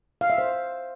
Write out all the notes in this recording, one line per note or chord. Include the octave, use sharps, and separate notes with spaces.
F5
E5
C5